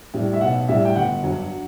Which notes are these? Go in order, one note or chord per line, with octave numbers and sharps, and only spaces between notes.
A2 G3
E5
B1 F#5
A2 G3 E5
G5
G1 F#5
G2 F#3